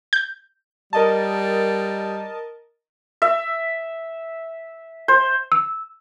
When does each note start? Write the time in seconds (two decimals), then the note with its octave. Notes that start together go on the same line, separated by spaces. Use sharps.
0.13 G6
0.93 G3 A#4 D#5 A5
3.22 E5
5.08 C5
5.52 E6